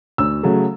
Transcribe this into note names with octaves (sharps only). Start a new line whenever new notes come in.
D2 E6
C#3 F#3 A3